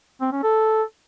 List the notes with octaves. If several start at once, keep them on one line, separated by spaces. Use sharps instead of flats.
C4
C#4
A4